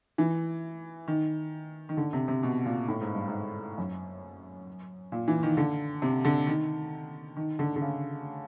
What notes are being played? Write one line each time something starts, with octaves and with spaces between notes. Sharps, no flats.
E3
D#3
D#3
D3
C3
C3
B2
A#2
A2
G#2
G2
G#2
F#2
A#2
E3
D#3
D3
C3
D3
D#3
D#3
D3
D3
C#3